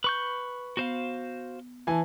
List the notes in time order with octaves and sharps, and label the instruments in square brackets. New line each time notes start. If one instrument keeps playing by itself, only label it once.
[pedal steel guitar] B4 C#6 G6
[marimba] B3 [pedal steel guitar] F#4 C5 F5
[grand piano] E3 G#5 [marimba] B4 E5 A5